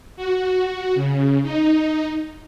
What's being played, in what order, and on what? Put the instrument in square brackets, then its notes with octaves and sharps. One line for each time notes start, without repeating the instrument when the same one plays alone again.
[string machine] F#4
C#3
D#4